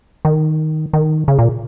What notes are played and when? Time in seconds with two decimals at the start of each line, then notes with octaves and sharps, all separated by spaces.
0.25 D#3
0.93 D#3
1.28 C#3
1.39 A#2